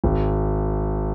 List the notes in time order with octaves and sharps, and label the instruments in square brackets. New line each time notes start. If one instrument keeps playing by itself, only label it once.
[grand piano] G#1